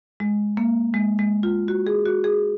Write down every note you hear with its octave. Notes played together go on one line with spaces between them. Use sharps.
G#3
A#3
G#3
G#3
F4
F#4
G#4
F#4
G#4